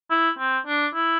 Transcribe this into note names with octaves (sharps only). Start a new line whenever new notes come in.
E4
C4
D4
E4